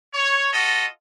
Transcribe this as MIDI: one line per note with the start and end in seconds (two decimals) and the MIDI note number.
0.14 0.50 73
0.52 0.85 65
0.52 0.85 66
0.52 0.85 69
0.52 0.85 75